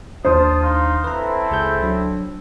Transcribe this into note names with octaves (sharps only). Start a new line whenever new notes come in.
D#2 D4 F4 C5 A5 D#6
D#4 F5 C6
C4 E4 A4 B4 A#5
C#2 G#4 G6
F#3 D4